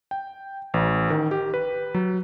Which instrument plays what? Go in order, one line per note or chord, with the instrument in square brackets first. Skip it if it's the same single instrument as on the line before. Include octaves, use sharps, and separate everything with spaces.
[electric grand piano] G5
A1
D#3
G4
B4
F#3